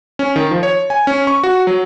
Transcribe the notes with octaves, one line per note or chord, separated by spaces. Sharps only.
C#4
D#3
F3
C#5
G#5
C#4
C#6
F#4
F#3